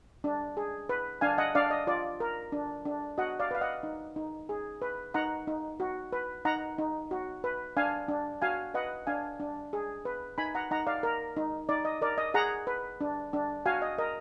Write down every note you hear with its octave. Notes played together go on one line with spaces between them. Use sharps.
D4
G#4
B4
D4 F5 G#5
D#5 F#5
D4 D5 F5
D#5
F4 D5
A#4
D4
D4
F#4 D#5 F#5
D5 F5
B4 F5
D#5 F#5
D#4
D#4
G#4
B4
D#4 F#5 A#5
D#4
F#4
B4
D#4 F#5 A#5
D#4
F#4
B4
D4 F5 G#5
D4
F#4 F5 G#5
B4 D#5 F#5
D4 F5 G#5
D4
G#4
B4
D#4 G#5 B5
F#5 A#5
D#4 F#5 A#5
D5 F5
A#4
D#4
D#4 D5
D#5
A#4 D5
D#5
G#4 F#5 A#5
B4
D4
D4
F#4 F5 G#5
D#5
A#4 D#5